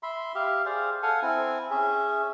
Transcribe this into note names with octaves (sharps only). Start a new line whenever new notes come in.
E5 B5 C6
G4 E5 F5
G#4 C5 D5 F5
A4 F5 F#5 G#5
C4 E4 G#5
C#4 G#4 E5